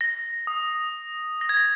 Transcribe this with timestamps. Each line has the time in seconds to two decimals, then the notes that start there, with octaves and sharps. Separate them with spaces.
0.01 A#6
0.47 D#6
1.41 A#6
1.49 G#6
1.57 A#6